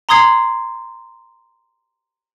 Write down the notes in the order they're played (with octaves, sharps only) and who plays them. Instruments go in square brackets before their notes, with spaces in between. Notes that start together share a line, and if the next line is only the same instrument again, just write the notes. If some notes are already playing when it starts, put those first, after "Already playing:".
[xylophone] A#5 C6 D#6 G#6 C7